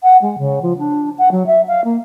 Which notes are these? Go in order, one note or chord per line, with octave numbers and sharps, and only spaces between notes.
F#5
G#3
C#3
F3
D4
F#5
F#3
E5
F5
A#3